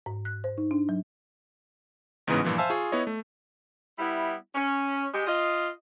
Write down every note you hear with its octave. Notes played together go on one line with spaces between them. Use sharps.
G#2
F#6
C5
D#4
D4
F#3
A1 G#2 C#3 E3 B3 D#6
G2 A#2 E3 F3
C5 E5 F5 G#5 A5 E6
F4 G#4 C#6
B3 E4 C#5 D#5
A3
G3 B3 E4
C#4
G#3 G4
F4 D#5